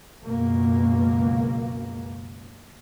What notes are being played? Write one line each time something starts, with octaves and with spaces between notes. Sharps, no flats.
C#2 F#2 B2 A#3